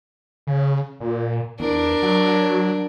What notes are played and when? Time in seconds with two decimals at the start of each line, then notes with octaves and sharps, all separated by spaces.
0.47 C#3
1.00 A#2
1.60 E2 D4 A#4
2.02 F#3